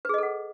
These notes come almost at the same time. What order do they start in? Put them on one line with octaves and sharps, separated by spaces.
B4 G#4 D#5 A4 F#5